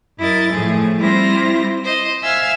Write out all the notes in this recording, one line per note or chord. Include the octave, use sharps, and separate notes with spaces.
F#2 E4 A#4 D#5 A6
A2 F3 A3 G#4
G3 C4 E4 F4 C5 A#6
C5 D#5
E5 F5 G#5 E6 F6